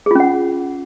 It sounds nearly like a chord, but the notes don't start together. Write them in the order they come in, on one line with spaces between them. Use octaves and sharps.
G#4 F4 C#4 F#5